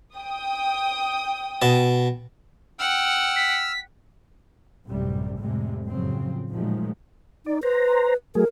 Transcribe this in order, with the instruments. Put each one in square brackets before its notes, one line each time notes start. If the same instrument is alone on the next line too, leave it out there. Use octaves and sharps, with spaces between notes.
[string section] G5 D#6
[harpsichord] B2 A5
[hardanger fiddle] F#5 G5 [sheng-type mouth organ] E6 F6
[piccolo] B6
[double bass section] A1 F#2 C3 G3
F2 A2 C3 G3 G#3
F#2 A2 C#3 F3 F#3 C4
A#2 D#3 F3 F#3 G#3 A3
[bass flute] D#4 [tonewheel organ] D5
[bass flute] B4 [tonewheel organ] C5 A#5
[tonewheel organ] F#3 A3 G#4 [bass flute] A#4